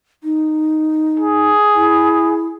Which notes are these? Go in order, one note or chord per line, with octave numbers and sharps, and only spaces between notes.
D#4
G#4
E4